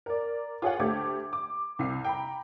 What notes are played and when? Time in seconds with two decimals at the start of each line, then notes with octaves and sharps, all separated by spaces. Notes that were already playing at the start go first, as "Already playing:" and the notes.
0.06 A#4 D5
0.62 F4 G#4 C#5 F#5
0.79 D2 A3 G4 D6 G#6
1.33 D6
1.79 C2 C7
2.04 G5 A#5 B5